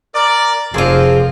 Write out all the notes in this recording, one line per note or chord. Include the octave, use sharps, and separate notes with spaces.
A#4 D5
F1 F3 A#3 C4 F4 G#4